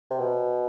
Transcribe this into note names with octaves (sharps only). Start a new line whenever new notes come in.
C3
B2